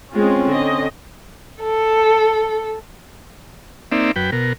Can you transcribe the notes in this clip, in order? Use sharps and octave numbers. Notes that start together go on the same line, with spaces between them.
G#3 C4 C#4 F4
D3 D#5
A4
A#3 C4 D#4 D5 E5
F#2 B4 G5
B2 A#4